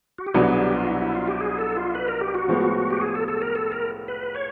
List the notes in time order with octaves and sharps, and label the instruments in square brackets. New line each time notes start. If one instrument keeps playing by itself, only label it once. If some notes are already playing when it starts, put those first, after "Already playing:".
[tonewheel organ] F#4
G4
[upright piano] C2 B2 F#3 B3 D4 [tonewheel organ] G#4
[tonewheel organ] G#4
G4
F4
E4
E4
F4
G4
G#4
A4
F4
B4
A#4
G4
F#4
[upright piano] A2 F3 G#3 B3
[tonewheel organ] G4
G#4
A4
A4
A#4
A4
A#4
B4
C#5